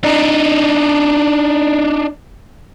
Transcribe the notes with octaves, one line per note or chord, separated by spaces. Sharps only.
D4 D#4